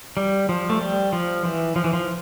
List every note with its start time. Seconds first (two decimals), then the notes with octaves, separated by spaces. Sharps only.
0.17 G3
0.49 F3
0.70 A3
0.81 G3
1.13 F3
1.45 E3
1.76 F3
1.84 E3
1.93 F3